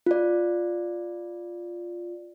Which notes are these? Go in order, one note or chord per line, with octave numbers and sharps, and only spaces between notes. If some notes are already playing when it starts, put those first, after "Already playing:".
F4 D5